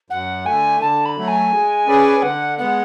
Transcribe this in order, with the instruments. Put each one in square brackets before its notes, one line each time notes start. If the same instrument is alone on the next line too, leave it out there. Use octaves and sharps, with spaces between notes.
[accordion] F#2 [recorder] F#5
[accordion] D3 A3 [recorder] G#5
[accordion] D3 [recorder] A5
[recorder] B5
[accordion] F#3 A3
[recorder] G#5
[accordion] G#3
C#4 G#4 B4 D5
[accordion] D3 [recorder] F#5
[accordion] G#3 B3 [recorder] F#5